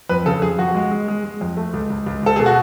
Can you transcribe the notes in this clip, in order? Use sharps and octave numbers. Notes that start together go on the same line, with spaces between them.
F2 B4
C#3 A4
F2 G#4
F2 F#4
G#3
G#3
G#3
G#3
F2
A3
C#2
C#2
C#2
C#2 A4
B2 G#4
F#4